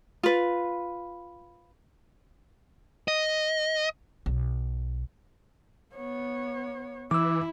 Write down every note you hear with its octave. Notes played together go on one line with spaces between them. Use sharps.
F4 B4
D#5
B1
B3 C#5
E3 E4 D6 E6